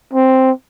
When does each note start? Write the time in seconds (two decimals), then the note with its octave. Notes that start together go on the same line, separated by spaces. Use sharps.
0.13 C4